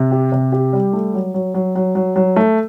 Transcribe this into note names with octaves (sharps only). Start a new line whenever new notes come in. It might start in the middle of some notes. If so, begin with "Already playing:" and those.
Already playing: C3
G4
C3
G4
G3
A3
F#3
F#3
F#3
F#3
F#3
F#3
A3